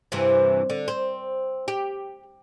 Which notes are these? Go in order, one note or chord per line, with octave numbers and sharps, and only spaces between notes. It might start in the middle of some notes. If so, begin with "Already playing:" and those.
G2 C3 E3
D3
C4
G4